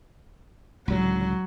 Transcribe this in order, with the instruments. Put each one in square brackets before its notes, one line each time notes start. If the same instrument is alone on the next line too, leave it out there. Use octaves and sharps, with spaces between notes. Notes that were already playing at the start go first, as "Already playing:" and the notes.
[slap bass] C#2 A2 D3 [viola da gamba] F#3